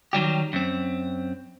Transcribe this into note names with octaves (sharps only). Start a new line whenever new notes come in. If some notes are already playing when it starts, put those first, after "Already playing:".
D#3 F#3 G3 G4
F#2 C4